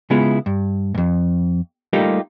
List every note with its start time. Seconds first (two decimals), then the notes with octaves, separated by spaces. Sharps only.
0.10 C#3 G#3 B3 E4 F4 G#4
0.46 G2
0.95 F2 G#2
1.93 G3 A3 A#3 D#4 F4 G4